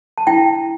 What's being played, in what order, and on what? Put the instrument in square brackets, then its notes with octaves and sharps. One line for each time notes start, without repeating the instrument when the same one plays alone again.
[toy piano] A5
E4 G5